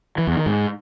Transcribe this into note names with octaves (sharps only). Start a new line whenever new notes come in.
E3
E2
D#3
G#2